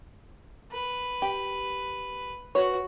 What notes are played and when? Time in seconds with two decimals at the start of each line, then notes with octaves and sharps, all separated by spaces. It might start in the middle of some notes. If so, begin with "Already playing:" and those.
0.72 B4
1.22 G4
2.55 F#4 B4 C#5